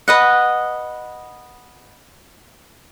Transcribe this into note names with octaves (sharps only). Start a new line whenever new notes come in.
B4 D#5 F#5